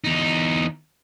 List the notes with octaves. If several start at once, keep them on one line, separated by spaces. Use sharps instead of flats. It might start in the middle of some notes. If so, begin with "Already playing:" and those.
E2 D#4